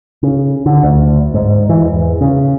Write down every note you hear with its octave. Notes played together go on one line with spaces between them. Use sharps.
C#3
D3
D2
G#2
E3
E2
C#3